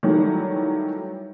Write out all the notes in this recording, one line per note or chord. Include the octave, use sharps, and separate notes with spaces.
D#3 E3 F#3 G3 A3